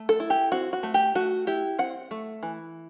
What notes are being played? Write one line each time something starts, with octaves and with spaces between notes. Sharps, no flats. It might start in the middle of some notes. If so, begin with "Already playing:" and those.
Already playing: A3
A4
E4
G4
C4 F#4
F#4
A3
G4
A3 F#4
E4 G4
C4 F#5
A3
E3